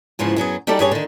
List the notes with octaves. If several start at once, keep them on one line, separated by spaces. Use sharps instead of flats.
E2 G#2 C#3 F3
F#2 F#3 B3 G#4
G3 D#4 F#4 G4 A4 D5
G2 C#4 G4 G#4 C#5 G#5
D3 D#3